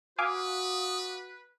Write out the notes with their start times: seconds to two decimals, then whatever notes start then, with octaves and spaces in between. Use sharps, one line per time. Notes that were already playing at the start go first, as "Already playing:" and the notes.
0.18 F#4 B4 F5 G#5 D6 D#6